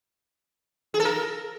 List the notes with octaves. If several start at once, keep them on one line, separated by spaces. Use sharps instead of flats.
G#4
A4
A#4